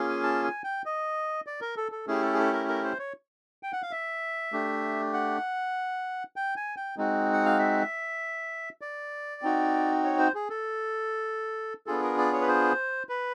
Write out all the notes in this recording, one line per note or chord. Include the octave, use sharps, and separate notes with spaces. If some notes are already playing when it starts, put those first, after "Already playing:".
Already playing: A#3 C#4 F4 G#4
G#5
A5
G#5
G5
D#5
D5
A#4
A4
A4
A3 C#4 E4 G4 G#4
A4
G#4
A4
A#4
A#4
C5
C#5
G5
F#5
F5
E5
A3 D4 G4
F#5
G5
G#5
G5
G#3 C4 D#4 F#4
F#5
F5
E5
D5
C4 D#4 F#4
C#5
C5
G#4
A4
B3 D4 F4 G#4 A4
A#4
D5
C#5
B4
C5
B4